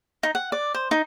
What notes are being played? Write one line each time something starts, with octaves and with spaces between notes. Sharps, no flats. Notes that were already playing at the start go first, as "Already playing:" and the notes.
D#4
F#5
D5
C5
D#4